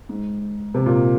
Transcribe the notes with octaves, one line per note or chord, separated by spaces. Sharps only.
G#2
C3
A#2